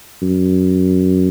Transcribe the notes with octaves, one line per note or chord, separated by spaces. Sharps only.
F#2